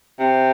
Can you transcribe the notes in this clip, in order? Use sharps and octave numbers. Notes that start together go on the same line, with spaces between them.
C3